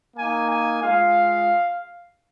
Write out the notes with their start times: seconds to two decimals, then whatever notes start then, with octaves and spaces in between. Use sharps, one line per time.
0.16 A#3 D#4 G#5
0.50 G#5
0.82 G#3 F4 F5